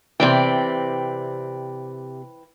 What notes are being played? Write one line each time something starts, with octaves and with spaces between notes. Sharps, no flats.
C3 E3 C4 D5 G5